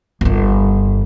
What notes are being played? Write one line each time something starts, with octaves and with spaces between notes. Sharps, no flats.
G1 D#3